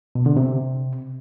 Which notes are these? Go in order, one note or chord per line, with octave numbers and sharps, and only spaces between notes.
B2
D3
C3